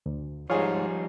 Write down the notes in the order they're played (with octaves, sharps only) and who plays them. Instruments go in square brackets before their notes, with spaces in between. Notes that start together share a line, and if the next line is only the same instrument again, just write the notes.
[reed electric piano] D2
[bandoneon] G#2 [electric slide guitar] F3 G3 D#4 [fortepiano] F4 G#4 [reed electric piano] C#5